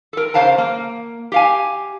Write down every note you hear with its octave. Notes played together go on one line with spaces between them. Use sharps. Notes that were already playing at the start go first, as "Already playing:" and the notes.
A4 A#4
C#3 G3 C5 F5 A5 A#5
A#3
G4 F5 G#5